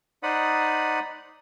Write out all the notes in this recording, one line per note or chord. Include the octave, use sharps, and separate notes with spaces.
D#4 C5 D5 F#5 B5 D#6